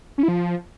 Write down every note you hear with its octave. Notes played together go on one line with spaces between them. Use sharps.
C#4
E4
F3